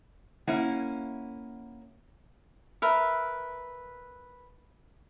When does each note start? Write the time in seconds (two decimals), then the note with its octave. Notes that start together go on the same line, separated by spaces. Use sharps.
0.47 A#3 C#4 E4 F#5
2.82 A#4 B4 E5